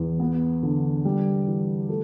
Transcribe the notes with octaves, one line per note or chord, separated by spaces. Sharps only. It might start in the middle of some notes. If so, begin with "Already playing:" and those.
Already playing: E2
B3
D3
G3
E3
A3